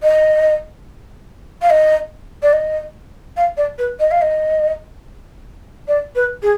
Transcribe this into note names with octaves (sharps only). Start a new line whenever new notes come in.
D#5
F5
D#5
D5
D#5
F5
D5
B4
D#5
F5
D#5
D5
B4
G#4